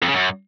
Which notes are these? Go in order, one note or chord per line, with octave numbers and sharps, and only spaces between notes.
F2
C#3
F#2